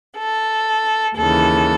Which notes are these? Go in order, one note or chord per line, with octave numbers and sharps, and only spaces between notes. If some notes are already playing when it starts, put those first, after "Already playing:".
A4
D#2 C#3 E3 A4